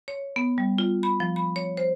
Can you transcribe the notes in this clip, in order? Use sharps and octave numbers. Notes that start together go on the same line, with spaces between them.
C#5
B3
G3
F4
B5
F3
B5
C#5
C5